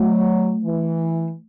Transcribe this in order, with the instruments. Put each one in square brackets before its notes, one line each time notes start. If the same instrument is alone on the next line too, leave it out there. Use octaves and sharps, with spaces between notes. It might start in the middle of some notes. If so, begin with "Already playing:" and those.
Already playing: [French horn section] F#3 [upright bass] A3
[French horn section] E3